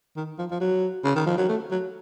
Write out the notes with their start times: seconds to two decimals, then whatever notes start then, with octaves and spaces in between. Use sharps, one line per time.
0.17 D#3
0.39 F3
0.51 F3
0.61 F#3
1.04 C#3
1.15 D#3
1.26 F3
1.38 F#3
1.49 A3
1.71 F#3